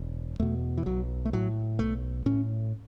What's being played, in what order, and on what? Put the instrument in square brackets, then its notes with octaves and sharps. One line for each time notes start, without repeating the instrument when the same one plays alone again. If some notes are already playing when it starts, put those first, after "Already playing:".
Already playing: [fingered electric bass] E1
E2 B2 A3
E3
B1 F#3
A3
A2 F#3
B1 A3
A2 C#4